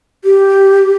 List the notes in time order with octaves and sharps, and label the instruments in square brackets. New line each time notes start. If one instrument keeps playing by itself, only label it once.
[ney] G4